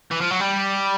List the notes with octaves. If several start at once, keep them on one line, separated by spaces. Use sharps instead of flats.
E3
F3
F#3
G3